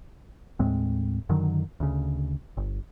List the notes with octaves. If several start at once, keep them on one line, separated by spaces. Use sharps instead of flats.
D#2 A2 G#3 C4
F#2 D3 D#3 F#3
D2 C#3
G1